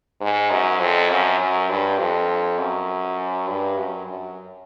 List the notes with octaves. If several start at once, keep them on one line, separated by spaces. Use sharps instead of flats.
G#2
F#2
F2
F#2
F#2
G2
F2
F#2
G2
F#2
F#2